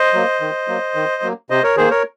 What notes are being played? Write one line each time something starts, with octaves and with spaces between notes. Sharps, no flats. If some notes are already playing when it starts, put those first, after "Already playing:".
Already playing: C5 D#5
F#3 A#3
D#3
F#3 A#3
D#3
F#3 A#3
C3 C5 D#5
A#4 C#5
D#3 A#3 G#4 C5
A#4 C#5